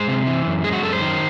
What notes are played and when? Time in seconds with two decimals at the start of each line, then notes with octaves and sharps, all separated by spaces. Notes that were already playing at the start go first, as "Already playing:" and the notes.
Already playing: G#3 C5
0.08 C3
0.27 E3
0.46 F#2
0.64 G#3 G#4
0.73 F#4
0.83 F#2 A4
0.92 C5
1.01 D#3